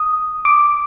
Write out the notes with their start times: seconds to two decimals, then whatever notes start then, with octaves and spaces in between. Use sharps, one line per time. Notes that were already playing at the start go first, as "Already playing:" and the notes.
Already playing: D#6
0.45 D6